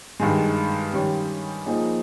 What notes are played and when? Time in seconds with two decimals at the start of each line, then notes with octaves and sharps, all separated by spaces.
0.20 G2 D#3 G#3
0.93 D#3 G3 C#4
1.66 F3 A#3 D#4 G#4